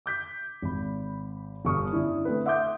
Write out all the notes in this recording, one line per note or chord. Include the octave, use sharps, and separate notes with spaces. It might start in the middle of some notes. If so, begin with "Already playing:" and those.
D6 G6 B6
G#1 B5
G1 C#6 D#6 F6
G2 D3 C#4 D4 E4
A3 C4 B4
E5 F#5 C6 D6 D#6 G6